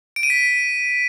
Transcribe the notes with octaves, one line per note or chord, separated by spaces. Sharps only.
D7
D#7
B6